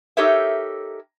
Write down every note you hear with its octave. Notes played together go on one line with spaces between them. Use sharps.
D#4 G4 A4 A#4 C#5 E5